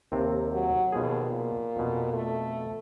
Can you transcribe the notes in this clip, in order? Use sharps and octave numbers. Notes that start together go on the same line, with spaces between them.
D#2 C3 C4 A#4
F#3
D#2 B2 F3 G#4
A#2
F2 B2
A3